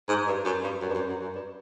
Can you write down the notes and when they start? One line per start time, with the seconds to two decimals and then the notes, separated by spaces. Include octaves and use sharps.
0.08 G#2
0.27 G2
0.45 F#2
0.63 G2
0.81 F#2
0.89 G2
0.94 F#2
1.08 F#2
1.21 F#2
1.35 G2